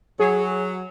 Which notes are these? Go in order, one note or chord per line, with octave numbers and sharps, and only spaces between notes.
F#3 G#4